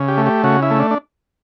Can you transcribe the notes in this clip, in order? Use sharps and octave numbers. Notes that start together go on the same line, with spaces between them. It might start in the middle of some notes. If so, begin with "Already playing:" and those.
Already playing: C#3
G4
A3
G4
C#3 F#4
E4
A3
D4
D4